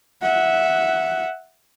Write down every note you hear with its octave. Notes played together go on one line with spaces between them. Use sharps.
E5 F#5